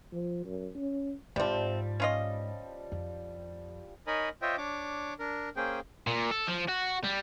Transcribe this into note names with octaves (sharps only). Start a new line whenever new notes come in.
F3
F#2
C#4
G#2 C3 F3 G3 C4
C#4 F4 D#5
F2
D#4 A#4 C#5 D#5 G#5 B5
F4 C5 C#5 D#5 E5 G5
D4 C#5 D6
D4 A#4
A#3 C#4 G#4 C5 G5
A#2
A4
F3
F#4
G3